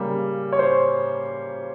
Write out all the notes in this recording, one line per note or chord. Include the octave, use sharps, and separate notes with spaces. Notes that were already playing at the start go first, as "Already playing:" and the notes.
Already playing: C#3 G3 A#3
C#5
C5